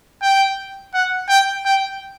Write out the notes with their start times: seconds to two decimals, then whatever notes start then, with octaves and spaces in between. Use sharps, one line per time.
0.22 G5
0.94 F#5
1.29 G5
1.65 G5